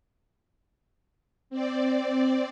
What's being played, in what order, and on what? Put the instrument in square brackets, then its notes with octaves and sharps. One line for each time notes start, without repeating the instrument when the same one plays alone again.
[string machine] C4 D5